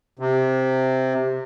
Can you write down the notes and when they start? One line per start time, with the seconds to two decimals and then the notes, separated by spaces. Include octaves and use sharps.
0.19 C3